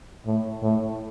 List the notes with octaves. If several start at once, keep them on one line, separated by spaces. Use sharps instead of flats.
A2
A2